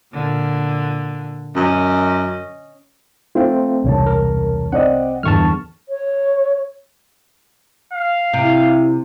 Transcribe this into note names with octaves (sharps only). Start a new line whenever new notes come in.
A#2 D3
F#2 C#4 D#5
A3 C4 F4
E1 C2 C#3 C#5 A5
A#4
C4 D5 D#5 F#5
G1 E2 A5 C#6 F6
C#5
F5
C3 E4